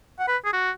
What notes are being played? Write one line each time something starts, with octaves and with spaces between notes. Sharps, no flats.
F#5
B4
G#4
F#4